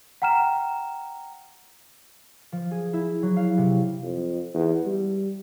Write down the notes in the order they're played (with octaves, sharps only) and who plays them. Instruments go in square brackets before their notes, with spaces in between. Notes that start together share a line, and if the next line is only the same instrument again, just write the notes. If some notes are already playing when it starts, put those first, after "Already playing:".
[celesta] F#5 G5 A#5 F6 E7
[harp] F3
G#4
E4
F#3
F5
C3
[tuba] F2
E2
G3